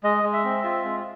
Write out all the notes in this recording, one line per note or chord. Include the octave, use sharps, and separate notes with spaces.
G#3 D#5
G#3
E5
C4
F4
G#3